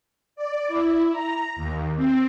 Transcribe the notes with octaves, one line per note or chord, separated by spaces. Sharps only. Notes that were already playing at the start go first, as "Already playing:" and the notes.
D5
E4
A#5
D#2
C4